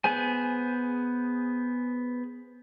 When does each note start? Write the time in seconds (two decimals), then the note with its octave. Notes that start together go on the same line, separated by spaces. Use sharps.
0.04 B3 G#4 C5 G#5